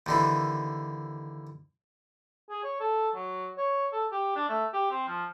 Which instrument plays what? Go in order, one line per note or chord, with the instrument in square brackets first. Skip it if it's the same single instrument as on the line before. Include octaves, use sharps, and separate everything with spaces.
[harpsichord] D#2 D3 E3
[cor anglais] G#4
C#5
A4
F#3
C#5
A4
G4
D4
A3
G4
C4
F3